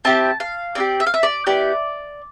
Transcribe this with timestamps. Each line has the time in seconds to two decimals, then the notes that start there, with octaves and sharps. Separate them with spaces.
0.05 C4 E4 G4 A5
0.40 F5
0.75 C4 E4 G4 D5
1.00 E5
1.06 F5
1.14 E5
1.23 D5
1.47 B3 E4 G4 D5